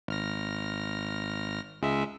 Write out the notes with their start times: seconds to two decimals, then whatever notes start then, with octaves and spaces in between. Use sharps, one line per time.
0.08 G#1 F6 A#6
1.82 C#2 G#3 E5